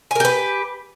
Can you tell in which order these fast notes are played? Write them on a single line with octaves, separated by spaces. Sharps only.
G#5 A#4 G4 B4